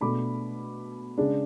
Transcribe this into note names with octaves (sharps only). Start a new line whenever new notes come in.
B2 A3 D4 B5 D6
C#3 G#3 D4